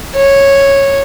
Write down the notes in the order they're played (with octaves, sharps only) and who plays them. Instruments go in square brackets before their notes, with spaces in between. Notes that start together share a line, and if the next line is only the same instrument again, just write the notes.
[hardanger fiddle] C#5